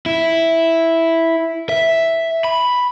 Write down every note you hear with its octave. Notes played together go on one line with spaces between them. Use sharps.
E4
E5
B5